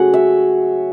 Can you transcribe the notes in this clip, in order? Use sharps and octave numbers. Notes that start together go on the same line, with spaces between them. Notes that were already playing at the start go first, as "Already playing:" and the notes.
Already playing: C#3 F#3 A3 F#4 G#4 F#5
E5